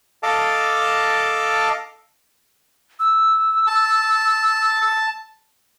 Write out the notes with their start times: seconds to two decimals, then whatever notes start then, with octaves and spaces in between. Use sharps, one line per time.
0.23 A4 D#5 F5 A5 D6
3.00 E6
3.67 A5